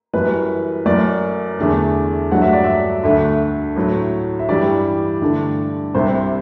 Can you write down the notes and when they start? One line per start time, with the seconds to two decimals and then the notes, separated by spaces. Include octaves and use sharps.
0.13 F#2 E3 G3 B4
0.86 F#2 F#3 A3 D5
1.59 E2 D3 A3
2.31 G2 F#3 A3 F#5
2.42 E5
2.53 D5
2.64 E5
3.03 D2 D3 A3 E5
3.76 A2 F#3 A3
4.39 E5
4.49 G2 E3 G3 D5
5.22 G2 D3 A3
5.94 C2 C3 G3 C5